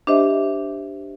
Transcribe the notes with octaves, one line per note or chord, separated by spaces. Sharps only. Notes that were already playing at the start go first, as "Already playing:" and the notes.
D4 G4 C5 D#5 E5